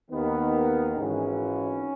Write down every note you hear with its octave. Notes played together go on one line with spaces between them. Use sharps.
D#2 D#3 B3
G#1 G#2 E3 C#4